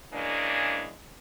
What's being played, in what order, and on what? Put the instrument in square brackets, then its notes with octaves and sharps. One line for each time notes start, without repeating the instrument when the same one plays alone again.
[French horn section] C#3 E3 G#3 A#3 D4